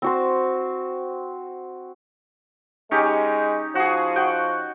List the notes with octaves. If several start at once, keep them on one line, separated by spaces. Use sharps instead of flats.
C4 F#4 C5
G#3 C#4 D#4 G4
F3 F#4 G#4
F#4 G5